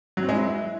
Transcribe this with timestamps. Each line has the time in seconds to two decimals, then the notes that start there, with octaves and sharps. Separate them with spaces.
0.17 F#3
0.23 C4
0.29 G#3
0.34 E4